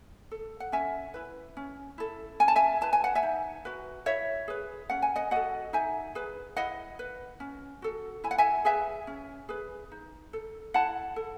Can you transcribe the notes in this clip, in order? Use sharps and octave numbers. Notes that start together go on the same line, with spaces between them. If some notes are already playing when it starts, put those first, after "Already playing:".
A4
F#5
C#4 E5 G#5
E4 B4
C#4
E4 A4
C#4 G#5
A5
E5 G#5
E4 B4 A5
G#5
F#5
E5 G#5
D#4
F#4 B4
E4 C#5 E5
G#4 B4
C#4 F#5
G#5
D#5 F#5
F#4 A4 D#5 F#5
D#4 E5 G#5
G#4 B4
E4 D#5 F#5
B4
C#4
F#4 A4
E4 G#5
F#5
E5 G#5
G#4 B4 E5 G#5
C#4
G#4 B4
D#4
A4
E4 F#5 A5
A4